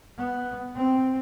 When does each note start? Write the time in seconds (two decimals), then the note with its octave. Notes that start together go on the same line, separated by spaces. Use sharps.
0.18 B3
0.76 C4